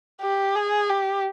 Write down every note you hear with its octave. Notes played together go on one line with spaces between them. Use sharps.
G4
G#4
G4